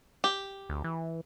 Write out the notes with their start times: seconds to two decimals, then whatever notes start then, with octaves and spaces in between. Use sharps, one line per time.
0.24 G4
0.69 D2
0.84 E3